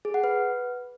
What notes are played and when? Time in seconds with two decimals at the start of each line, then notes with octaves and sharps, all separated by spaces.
0.05 G#4
0.14 F#5
0.24 B4